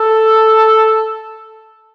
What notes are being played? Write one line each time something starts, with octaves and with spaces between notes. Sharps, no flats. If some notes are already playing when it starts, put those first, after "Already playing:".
Already playing: A4